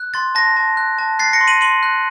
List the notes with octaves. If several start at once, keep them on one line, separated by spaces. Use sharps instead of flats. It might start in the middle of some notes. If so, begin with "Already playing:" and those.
Already playing: F#6
C6 A6
A5 A#6
A5
F#6
A5
F#6 A6 C7
A#6 C#7
C6
D#7 F#7
C6 D#7 F#7
F#6